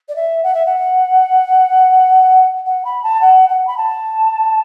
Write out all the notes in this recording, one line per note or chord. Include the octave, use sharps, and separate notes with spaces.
D5
E5
F#5
E5
F#5
F#5
B5
A5
F#5
F#5
B5
A5